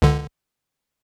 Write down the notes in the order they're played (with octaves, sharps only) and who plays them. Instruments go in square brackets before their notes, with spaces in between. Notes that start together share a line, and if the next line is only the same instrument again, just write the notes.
[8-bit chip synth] C#2 D3